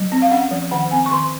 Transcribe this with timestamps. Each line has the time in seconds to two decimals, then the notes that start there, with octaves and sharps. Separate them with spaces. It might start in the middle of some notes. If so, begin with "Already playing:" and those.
Already playing: F#3
0.12 C4
0.22 F5
0.31 C#4 F#5
0.51 F3
0.71 D#3 F#5
0.91 C4 G#5
1.06 C#6
1.11 D#3 C6